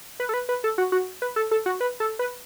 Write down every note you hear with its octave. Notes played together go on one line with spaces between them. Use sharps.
B4
A4
B4
B4
A4
F#4
F#4
B4
A4
A4
F#4
B4
A4
B4